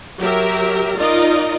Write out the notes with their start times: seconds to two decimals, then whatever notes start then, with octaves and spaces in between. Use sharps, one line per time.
0.18 F#3 G4 A#4 E5
0.97 D#4 F4 A#4 D5 D#5